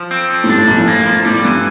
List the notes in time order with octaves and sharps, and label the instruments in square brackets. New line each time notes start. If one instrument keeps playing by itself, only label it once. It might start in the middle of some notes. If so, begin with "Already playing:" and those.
Already playing: [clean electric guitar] F3
C4
F3
[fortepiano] A2
[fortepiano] G2 [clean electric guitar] D4
[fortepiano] A2
[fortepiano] A#1 A#2 [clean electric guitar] G3
[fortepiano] A2
[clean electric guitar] A#3
F3
[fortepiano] A2 [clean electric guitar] G3
[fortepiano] G2 [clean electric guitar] E3